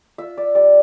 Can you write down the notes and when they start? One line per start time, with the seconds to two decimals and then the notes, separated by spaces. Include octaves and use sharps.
0.18 F4 E5
0.37 D5
0.55 G3 D5